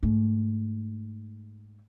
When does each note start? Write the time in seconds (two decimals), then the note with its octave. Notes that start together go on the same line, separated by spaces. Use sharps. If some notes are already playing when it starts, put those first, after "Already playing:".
0.03 G#2 A3